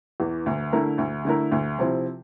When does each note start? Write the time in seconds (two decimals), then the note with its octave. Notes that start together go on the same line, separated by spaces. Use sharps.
0.20 E2 E3
0.46 D2
0.72 D3 A3 E4 A#4
0.98 D2
1.25 D3 A3 E4 A#4
1.52 D2
1.78 C3 F3 C4 E4